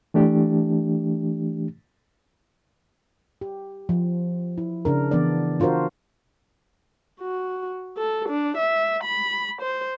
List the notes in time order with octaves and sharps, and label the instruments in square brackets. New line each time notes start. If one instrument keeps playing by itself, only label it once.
[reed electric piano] E3 A3 D4 G4
[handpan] G4
F3
E4
C#3 D4 A#4
E3 B3 D4 D5
D4 F4 F#4 A#4 C5
[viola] F#4
A4
D4
E5
B5
C5